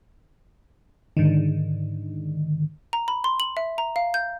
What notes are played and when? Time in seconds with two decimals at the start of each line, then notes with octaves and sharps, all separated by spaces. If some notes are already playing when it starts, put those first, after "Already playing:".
1.17 G#2 D3 D#3
2.93 A#5
3.08 B5
3.24 C6
3.40 F#7
3.57 E5
3.78 A#5
3.96 F5
4.14 G6